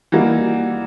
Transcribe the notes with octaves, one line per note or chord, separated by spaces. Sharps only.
E3 G3 A#3 D#4 F#4